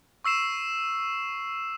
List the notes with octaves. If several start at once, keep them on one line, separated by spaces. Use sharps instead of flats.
C#6 E6 C7 E7